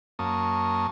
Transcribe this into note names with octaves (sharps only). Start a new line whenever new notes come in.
F#2 A#3 A5 C#6 D#6